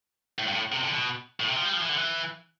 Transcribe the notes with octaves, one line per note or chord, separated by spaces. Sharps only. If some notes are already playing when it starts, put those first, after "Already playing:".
A2
G2
A2
C3
D3
B2
A2
C3
F3
G3
F3
E3
D3
E3